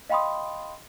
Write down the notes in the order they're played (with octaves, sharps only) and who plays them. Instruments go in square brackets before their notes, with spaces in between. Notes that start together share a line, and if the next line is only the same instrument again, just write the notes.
[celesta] D#5 F5 G5 B5 C6 D#6